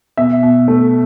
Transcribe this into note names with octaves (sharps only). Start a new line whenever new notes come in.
B2 E5
B2
A3